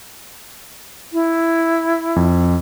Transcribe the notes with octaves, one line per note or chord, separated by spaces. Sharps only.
E4
F2